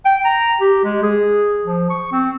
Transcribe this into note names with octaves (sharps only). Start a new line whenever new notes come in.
G5
A#5
G4
G#3
G#4
F3
C#6
C4